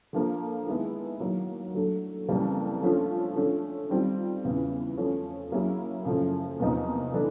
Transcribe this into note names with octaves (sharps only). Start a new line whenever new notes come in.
D3 F3 A#3
D#3 G#3 B3 E4
D#3 F#3 A#3
D3 F#3 A3
F2 C#3 E3 G3 A#3
D3 F3 A3 C#4 F4
D3 F3 A3 C#4
D#3 G3 C4 F4
E2 C#3 E3
F3 A3 C#4
F#3 A#3 C#4 E4 G#4
F#2 C#3 F3 A3
E2 C3 F3 A#3 D#4
E3 A3 D4